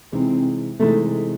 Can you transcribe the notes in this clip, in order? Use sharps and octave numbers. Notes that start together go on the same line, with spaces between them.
C3 E3 G#3 C4 D#4
C3 E3 G#3 A3 D#4